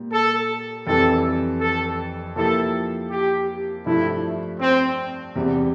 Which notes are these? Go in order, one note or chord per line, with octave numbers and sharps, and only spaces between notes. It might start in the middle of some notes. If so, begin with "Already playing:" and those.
Already playing: A#2 G3 A#3 G4
A4
F2 E3 G3 A4
A4
F3 A#3 E4 G4 A4
G4
G2 F3 A3 E4
C4
E2 C3 G3